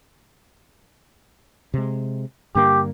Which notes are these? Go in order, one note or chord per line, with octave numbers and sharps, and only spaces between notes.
C3 G#3
G2 D3 A#3 G4